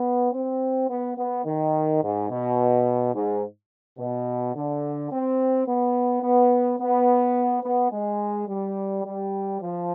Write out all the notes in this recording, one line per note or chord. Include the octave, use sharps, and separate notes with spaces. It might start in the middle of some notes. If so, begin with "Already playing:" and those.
Already playing: B3
C4
B3
B3
D#3
G#2
B2
G#2
B2
D3
C4
B3
B3
B3
B3
G#3
G3
G3
F3